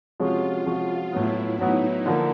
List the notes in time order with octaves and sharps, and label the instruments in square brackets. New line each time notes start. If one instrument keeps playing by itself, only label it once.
[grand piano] C3 F3 G#3 C#4 F#4 [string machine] F4
[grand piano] C3 F3 G#3 C#4 F#4
[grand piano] A2 F#3 B3 [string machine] E4
[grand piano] A2 F#3 B3 [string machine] D#4
[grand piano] D3 F3 A#3